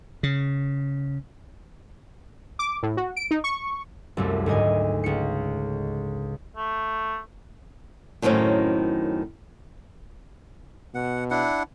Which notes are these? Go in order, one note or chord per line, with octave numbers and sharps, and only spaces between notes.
C#3
D6
A2
F#4
D7
D#4
C#6
C2 F#2 A3
D2 G#2 D#5 G#5
C#2 C#7
A3
F#2 A2 D#3 C4 C#4
B2 F#5
D4 E4 F#5